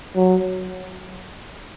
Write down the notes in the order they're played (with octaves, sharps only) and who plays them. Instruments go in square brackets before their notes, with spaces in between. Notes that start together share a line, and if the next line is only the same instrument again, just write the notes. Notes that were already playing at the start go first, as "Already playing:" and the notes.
[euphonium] F#3